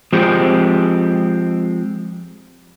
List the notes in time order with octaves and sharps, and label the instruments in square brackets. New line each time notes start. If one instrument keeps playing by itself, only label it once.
[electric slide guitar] F3 G#3 C4 G4